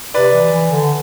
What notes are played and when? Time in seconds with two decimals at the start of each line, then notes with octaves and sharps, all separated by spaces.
0.14 C3 B4 D5
0.33 E3
0.52 E3
0.71 D3